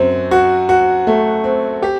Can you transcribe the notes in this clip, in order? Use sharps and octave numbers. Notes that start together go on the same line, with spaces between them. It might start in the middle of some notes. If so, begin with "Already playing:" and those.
Already playing: F#2 C4
F#4
F#4
A3
C4
G4